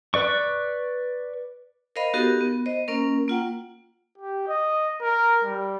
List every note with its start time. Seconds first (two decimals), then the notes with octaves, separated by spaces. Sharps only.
0.14 B4 D5 C#6
1.96 A#4 C5 D#5 F5 B5
2.14 B3 D#4 F#4 G4 A4 A#4
2.41 B3
2.66 C5 D#5
2.88 A#3 C#4 A#4
3.28 A#3 F4 F#5 G5
4.18 G4
4.48 D#5
5.02 A#4
5.45 G3